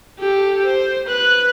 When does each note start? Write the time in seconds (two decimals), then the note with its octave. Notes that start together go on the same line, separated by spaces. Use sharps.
0.19 G4 A4
0.65 C5
1.07 B4 F#6